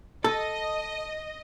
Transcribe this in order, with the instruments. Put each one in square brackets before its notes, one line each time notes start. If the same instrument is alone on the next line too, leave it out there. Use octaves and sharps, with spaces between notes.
[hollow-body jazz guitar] A4 [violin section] D#5